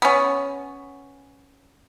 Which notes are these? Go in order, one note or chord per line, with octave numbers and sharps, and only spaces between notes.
B3 C#4